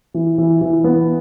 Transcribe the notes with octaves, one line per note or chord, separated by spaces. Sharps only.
E3
E3
E3
B3